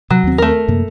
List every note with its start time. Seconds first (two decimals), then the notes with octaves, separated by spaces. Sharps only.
0.10 C3 F#3
0.23 D#2 C4
0.38 A3 A#4
0.68 F#2 C3 A#3